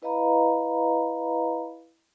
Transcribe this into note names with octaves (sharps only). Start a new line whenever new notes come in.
E4 B4 D#5 F5 A#5 B5